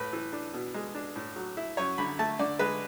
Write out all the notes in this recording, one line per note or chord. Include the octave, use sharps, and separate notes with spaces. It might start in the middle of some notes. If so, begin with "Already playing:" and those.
Already playing: A2 B4
E3
D4
B2
G#3
D4
A2
F#3
E4
F#2 C#5
D3 B5
A3 A5
D3 D5
G#3 B4